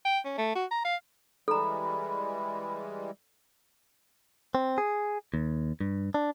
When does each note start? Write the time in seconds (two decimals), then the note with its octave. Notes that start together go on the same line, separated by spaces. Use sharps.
0.05 G5
0.25 C#4
0.38 A3
0.56 F#4
0.71 A#5
0.85 F5
1.48 E3 G3 G#3 A4 A#5 B5
4.55 C4
4.78 G#4
5.34 D#2
5.81 G2
6.14 D4